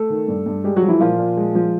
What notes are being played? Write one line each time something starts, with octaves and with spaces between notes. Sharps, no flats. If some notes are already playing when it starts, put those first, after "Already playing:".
Already playing: A3 A4
D#3
G2
G2
G3 G#3 G4
F#3 F#4
F3
E3 E4
A#2 F3 F4
A#2
G#3
F3